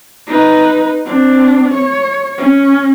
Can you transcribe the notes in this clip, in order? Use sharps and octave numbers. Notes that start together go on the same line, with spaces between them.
D#4 B4
C4 D4
C#5
C#4